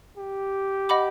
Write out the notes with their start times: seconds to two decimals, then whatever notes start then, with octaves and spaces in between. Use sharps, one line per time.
0.17 G4
0.89 D#5 F#5 B5 D6